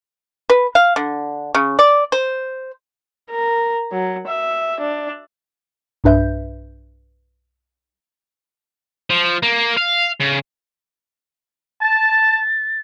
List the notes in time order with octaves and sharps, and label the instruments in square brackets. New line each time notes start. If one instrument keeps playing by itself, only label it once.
[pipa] B4
F5
D3
C#3
D5
C5
[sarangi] A#4
F#3
E5
D4
[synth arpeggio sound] B1 G2 D4 B4 E5 G6
[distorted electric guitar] F3
A#3
F5
C#3
[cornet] A5 [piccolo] A6